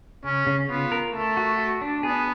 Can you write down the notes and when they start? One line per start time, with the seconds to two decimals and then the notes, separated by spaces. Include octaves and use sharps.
0.24 C#3 C#4
0.47 C#3
0.69 B3 F4
0.92 A#4
1.14 A3 A4
1.37 F#4
1.59 F#4
1.82 D4
2.03 B3 G#4